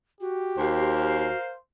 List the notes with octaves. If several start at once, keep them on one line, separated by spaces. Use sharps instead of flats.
F#4 G4
D#2 A#4 C5 F5